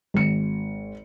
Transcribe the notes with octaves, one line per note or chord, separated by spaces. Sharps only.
G#1 C#7